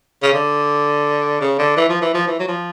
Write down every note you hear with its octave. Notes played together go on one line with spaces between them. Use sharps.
C#3
D3
C#3
D3
E3
F3
E3
F3
E3
F#3
F3